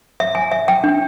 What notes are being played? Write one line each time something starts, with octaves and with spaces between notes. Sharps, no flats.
E5
G#5
E5
G5
D4